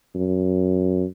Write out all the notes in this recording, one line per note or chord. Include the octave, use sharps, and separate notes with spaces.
F#2